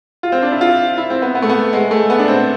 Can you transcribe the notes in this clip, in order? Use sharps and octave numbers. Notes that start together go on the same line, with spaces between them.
F4
C4
D4
E4
F4
E4
C4
B3
B3
A3
B3
G#3
A3
B3
D4
C4